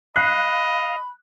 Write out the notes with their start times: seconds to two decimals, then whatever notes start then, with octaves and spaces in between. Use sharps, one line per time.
0.16 D#5 F5 B5 F#6